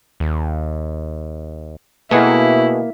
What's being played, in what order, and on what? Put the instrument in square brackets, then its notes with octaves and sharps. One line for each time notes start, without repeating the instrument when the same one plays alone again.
[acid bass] D#2
[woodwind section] B2 [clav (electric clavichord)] A3 G#4 F#5 [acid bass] A#3 [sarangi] E4